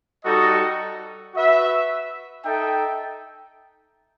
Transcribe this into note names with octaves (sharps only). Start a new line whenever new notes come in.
G3 D#4 F#4 A4 D#5
F#4 B4 E5
D#4 A4 E5 G5